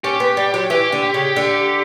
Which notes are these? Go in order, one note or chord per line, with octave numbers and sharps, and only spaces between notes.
C#4 G4
B3
G3
F#3
E3 G4
D3
C#3
D3